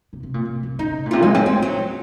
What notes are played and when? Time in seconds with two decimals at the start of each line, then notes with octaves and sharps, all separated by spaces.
0.13 C3
0.23 C3
0.34 A#2
0.45 C3
0.63 C3
0.79 C#3 D#4
1.06 A#2
1.11 C3 F4
1.23 G#3 D#4
1.35 C4 C#4
1.46 A#3 C4
1.62 F#3 C4
1.80 C#4